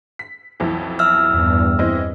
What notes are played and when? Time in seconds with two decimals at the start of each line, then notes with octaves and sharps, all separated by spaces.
0.19 B6
0.60 B1 F2 E3
0.99 E5 E6 F6
1.30 E2 G2
1.79 E3 C4 D#5